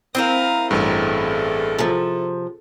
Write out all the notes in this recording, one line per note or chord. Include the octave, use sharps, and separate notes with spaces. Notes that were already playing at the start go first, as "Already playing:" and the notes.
C4 E4 A#4 F5 D#6
A1 G2 G#4 A4
C3 F3